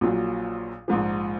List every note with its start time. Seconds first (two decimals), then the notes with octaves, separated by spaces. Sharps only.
0.01 A#1 A#2 F#3
0.88 A#1 G#2 F3